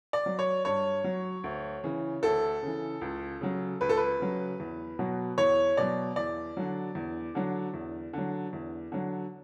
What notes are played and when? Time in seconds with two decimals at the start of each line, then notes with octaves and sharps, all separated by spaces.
0.13 D5
0.26 F#3
0.39 C#5
0.65 G2 C#5
1.04 F#3
1.44 D2
1.84 C#3 E3
2.23 D2 A4
2.62 C#3 E3
3.01 C#2
3.41 C#3 F#3
3.81 C#2 B4
3.89 A4
3.97 B4
4.19 C#3 F#3
4.60 E2
4.99 B2 F#3
5.38 E2 C#5
5.77 B2 F#3 D5
6.16 E2 D5
6.57 D3 F#3
6.95 E2
7.35 D3 F#3
7.74 E2
8.13 D3 F#3
8.53 E2
8.92 D3 F#3